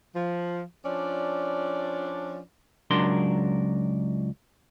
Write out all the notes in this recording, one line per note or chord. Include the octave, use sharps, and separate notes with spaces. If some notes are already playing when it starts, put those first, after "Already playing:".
F3
F3 C#4 D4 D5
C#2 F#3 D4 A#4 C6